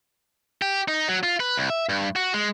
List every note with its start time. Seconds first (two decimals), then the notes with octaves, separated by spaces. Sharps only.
0.62 G4
0.88 D#4
1.08 F#3
1.23 F4
1.40 B4
1.57 C2
1.70 E5
1.89 G2
2.16 F#4
2.34 G#3